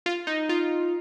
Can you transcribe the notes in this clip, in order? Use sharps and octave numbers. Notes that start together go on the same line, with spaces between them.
F4
D#4
F4